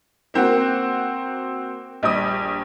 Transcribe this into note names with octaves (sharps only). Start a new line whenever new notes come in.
A#3 C4 F#4
A#1 G3 D#6